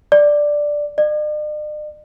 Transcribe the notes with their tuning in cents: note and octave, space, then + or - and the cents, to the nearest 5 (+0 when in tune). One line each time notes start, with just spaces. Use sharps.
D5 +5
D5 +45